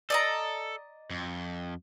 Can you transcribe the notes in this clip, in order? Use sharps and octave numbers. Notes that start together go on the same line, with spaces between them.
A4 D5 D#5 A#5
F2